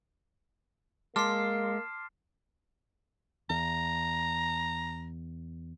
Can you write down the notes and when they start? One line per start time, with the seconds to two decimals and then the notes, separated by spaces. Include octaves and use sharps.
1.16 G#3 A#3 A5 C6 D6 F6 C7
3.50 E2 A#5